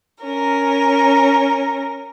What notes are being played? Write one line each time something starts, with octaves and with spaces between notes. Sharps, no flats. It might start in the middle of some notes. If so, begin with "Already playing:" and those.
C#4 A#4